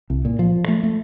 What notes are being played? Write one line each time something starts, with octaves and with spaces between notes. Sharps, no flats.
C2
A#2
F3
A3
A3